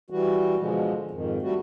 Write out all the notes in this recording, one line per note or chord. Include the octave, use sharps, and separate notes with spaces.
E3 G3 F#4
B2 D3 F3 G#3
F2 G#2 D#3
G3 A3 F#4